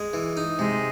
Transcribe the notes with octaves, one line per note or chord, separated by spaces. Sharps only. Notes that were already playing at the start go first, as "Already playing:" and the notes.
Already playing: G#3
E3
D#4
C3 G#3